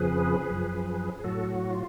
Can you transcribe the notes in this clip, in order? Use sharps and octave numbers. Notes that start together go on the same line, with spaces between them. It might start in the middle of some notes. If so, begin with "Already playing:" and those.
Already playing: F2 C#3 F3 G#4 B4
F#2 F3
G#4
A2 F#3 F#4 A4
F#4
F4